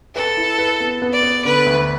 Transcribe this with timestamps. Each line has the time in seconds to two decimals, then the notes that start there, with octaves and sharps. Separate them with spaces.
0.15 A4 B4
0.37 E4
0.58 B4
0.80 B3
1.02 B3
1.13 D5
1.23 B3
1.45 D3 B4
1.66 D2